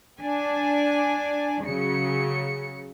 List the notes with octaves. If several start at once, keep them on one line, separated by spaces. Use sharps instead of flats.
D4 D5 G#5
C#3 F#3 C#7